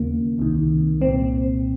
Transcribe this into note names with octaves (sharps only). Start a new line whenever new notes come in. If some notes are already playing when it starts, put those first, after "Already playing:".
Already playing: D#2 C#3 A#3
C2 C3 D#3
C2 A#2 C4